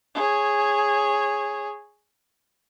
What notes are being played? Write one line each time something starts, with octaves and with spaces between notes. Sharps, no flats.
G#4 C#5